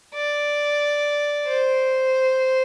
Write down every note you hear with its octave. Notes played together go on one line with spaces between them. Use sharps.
D5
C5